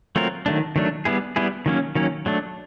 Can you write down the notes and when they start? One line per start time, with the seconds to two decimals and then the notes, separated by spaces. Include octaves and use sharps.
0.16 F#3 A3 C4 F4 A#4
0.46 D#3 F#3 A3 D4
0.76 D#3 F#3 A3 D4
1.05 G3 B3 E4 G#4
1.36 G3 B3 E4 G#4
1.66 D#3 F#3 A#3 C#4
1.95 D#3 F#3 A#3 C#4
2.26 F#3 A3 D4